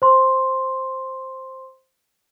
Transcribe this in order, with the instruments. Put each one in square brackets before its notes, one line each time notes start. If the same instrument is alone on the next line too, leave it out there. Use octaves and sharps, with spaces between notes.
[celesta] C5 C6